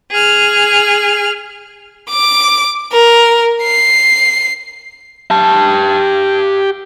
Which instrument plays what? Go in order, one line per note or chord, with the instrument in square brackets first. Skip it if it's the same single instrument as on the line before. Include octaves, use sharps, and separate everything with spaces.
[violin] G#4 F6
D6
A#4
C7
[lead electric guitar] G4 A5